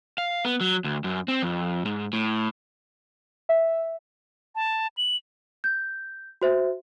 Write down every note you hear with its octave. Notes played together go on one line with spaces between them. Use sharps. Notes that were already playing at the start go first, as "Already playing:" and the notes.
F5
B3
F#3
D2
F#2
C4
F2
G#2
A2
E5
A5
F#7
G6
F#4 C5 E5